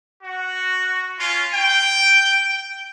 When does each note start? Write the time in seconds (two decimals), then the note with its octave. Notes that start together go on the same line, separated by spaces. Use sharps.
0.22 F#4
1.19 C#4 F4
1.53 G5